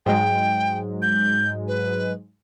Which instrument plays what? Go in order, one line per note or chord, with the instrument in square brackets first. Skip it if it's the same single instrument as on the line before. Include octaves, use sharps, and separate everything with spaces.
[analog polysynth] G#2 F#3 G#3 [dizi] G5
[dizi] G6
B4